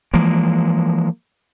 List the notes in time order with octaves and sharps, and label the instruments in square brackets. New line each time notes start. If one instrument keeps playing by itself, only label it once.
[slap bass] E3 F3 G#3 A#3